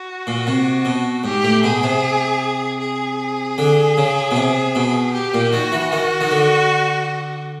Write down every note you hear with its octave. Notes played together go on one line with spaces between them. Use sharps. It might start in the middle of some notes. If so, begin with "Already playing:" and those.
Already playing: F#4
A#2
C3
B2
G#2 G4
A2
B2 G#4
C3
G#4
D3
C#3
B2
C3
B2
G4
A#2
D#3 F#4
E3
D#3
D#3
D3